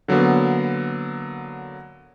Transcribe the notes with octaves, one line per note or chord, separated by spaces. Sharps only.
D3 F#3 A#3 B3